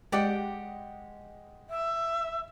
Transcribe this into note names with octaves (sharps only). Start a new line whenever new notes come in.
G#3 G4 D5 D#5 F#5 G5
E5